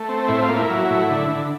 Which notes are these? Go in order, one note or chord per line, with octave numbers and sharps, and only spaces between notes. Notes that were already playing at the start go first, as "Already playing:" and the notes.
Already playing: A3
C4
A2 E4
F4
A#3
E4
F#3
A2
D3
D3